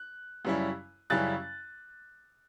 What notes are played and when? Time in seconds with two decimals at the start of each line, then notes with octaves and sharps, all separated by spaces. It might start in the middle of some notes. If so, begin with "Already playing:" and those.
Already playing: F#6
0.45 F#2 C#3 G3 C#4 E4
1.10 F#2 C#3 G3 C#4 E4 F#6 A6